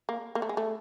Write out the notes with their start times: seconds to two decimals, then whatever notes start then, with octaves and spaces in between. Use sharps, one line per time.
0.09 A#3
0.35 A#3
0.42 A3
0.49 G#3
0.57 A3